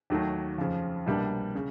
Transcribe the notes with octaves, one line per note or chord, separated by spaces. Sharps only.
D#2 D#3 F#3 A3
F2 C#3 F3
C2 B2 G3 A#3 D4
C#3